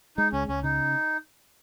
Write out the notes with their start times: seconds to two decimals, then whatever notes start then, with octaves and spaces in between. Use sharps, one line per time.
0.17 G#3 D#4
0.33 C#2 C#4
0.49 C#2 C#4
0.63 C#3 D#4